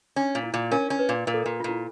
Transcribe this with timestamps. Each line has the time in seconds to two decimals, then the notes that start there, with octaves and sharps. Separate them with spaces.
0.16 C#4
0.35 A#2
0.43 E4
0.54 A#2
0.71 C#4 A#4
0.90 C#4
0.99 B4
1.09 A#2
1.27 A#2 A#4
1.34 A4
1.41 A#2 A#4
1.60 F4
1.64 A#2 E4